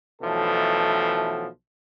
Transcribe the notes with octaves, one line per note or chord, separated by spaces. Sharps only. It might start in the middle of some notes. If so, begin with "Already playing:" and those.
B1 B2 E3 F3 A3 A4